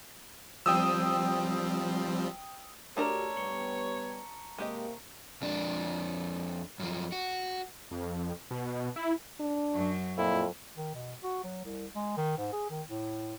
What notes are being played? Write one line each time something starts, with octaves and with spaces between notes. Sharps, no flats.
F3 G3 C4 G5 D#6 E6
A3 D4 F#4 G4 A#4 C#5 A5 A#5
G3 B3 C#6 C#7 F#7
C3 G#3 A#3 G4 D#5
F2 D4
F#2 F3
F#4
F2
B2
E4
D4
F#2 F#3
F2 A#2 E4
D#3
B2
F#4
F#3
C2
G#3
D#3
G#2
G#4
D#3
A2